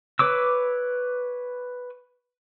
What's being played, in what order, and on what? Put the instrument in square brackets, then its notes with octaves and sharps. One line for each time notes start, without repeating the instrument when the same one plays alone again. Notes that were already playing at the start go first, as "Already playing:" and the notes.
[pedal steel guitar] B4 C#5 D6 E6